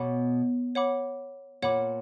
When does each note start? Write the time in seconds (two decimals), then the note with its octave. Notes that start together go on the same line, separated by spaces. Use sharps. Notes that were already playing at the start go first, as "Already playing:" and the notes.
Already playing: B2 C#5 F#5 B5 D6
0.75 C#5 F#5 B5 D6
1.62 A#2 C#5 F#5 B5 D6